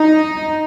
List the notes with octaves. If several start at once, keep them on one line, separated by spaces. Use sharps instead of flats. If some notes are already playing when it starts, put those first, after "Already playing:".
Already playing: D#4